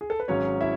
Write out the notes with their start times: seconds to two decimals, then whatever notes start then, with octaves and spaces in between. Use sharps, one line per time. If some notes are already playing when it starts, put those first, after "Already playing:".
0.01 G#4
0.10 A4
0.20 B4
0.28 G#1 G#2 F#3 C#4 C#5
0.61 E4 E5